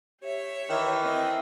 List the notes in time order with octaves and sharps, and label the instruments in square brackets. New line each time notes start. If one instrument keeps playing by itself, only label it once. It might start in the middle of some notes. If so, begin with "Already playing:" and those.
[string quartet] G4 C#5 E5
[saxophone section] D#3 E3
[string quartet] C4 D#5 E5